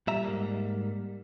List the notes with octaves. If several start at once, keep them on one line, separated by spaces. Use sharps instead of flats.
A#2 G3 E5 A#5
G#2 A#3